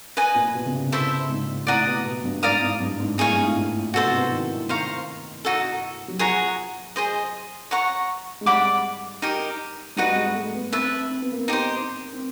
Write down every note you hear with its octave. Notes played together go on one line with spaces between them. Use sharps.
B4 D#5 G#5
A#2
B2
C#3
C3
B2 E4 A4 C5 E5
G#2
A2 D5 F#5 A#5 D#6
B2
B2
G2
G#2 D5 F5 A#5 D#6
G#2
G2
G#2
A2 D#4 G#4 C#5 F5
G2
G#2
A2
A#2
B2 F#4 A4 C5
C3
B2
D#3
D#3 C5 F5 A#5 C#6
D#4 F#4 A4
F#3
F3 G#4 C#5 F#5 A#5
G#4 C5 D#5
C#5 F#5 A#5 C#6
G#3
G3 D5 F#5 B5 D6
D#4 G4 A#4
G3 D#4 F#4 B4 D#5
G#3
A3
B3
C4 B4 E5 A5
C4
B3
A#3
B3
D#4 G4 C5
C4